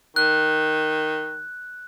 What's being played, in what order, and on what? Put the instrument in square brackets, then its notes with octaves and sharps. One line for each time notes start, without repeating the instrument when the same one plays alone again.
[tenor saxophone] D#3 [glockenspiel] F#6